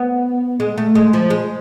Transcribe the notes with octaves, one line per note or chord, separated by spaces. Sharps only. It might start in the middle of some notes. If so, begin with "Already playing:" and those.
Already playing: B3
G#3
A3
G#3
F3
G#3